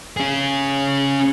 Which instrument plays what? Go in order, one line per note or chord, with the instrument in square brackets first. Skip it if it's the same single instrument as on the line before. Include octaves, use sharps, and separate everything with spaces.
[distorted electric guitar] C#4 G#4